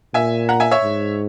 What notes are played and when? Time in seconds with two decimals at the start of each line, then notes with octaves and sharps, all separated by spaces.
0.14 A#2 E5 G#5
0.49 F#5 A#5
0.60 E5 G#5
0.71 C#5 E5
0.83 G#2